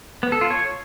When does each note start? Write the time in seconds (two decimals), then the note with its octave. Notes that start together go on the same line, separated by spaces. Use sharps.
0.23 B3
0.32 A4
0.41 F4
0.51 C#5